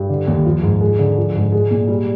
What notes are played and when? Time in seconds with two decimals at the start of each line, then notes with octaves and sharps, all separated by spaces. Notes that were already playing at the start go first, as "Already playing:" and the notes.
Already playing: G2
0.09 D3
0.27 D#2
0.46 F3
0.63 G#2
0.81 G#3
0.99 D3
1.18 F3
1.36 G#2
1.52 G#3
1.71 A#2
1.88 G3